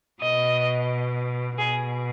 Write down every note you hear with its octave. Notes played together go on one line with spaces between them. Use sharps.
B2 D#5
B2 G#4